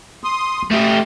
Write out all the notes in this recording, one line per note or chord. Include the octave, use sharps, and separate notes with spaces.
C6 D#6
A3 G4 D#6